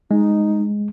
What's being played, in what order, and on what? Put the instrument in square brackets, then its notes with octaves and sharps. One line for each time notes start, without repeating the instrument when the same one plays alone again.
[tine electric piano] G#3 [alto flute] D#4